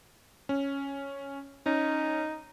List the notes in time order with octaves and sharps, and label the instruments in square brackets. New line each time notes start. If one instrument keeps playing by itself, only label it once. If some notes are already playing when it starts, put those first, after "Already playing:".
[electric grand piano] C#4
[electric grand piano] C#4 [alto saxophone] D#4